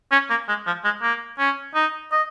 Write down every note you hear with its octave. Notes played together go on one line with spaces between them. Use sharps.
C#4
A#3
G#3
F3
G#3
A#3
C#4
D#4
D#5